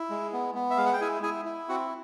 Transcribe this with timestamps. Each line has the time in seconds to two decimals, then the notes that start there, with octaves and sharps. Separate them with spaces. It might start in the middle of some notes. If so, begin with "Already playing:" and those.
Already playing: E4
0.10 G#3
0.33 B3
0.55 B3
0.70 E5
0.77 G#3 F5
0.86 F#5
0.93 G5
1.01 E4 G#4 G#5
1.23 E4 G#4 G#5
1.45 E4
1.69 C4 F#4 F#5